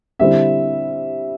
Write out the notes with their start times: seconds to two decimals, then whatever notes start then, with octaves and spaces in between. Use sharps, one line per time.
0.19 D3 G3 C4 E4 E5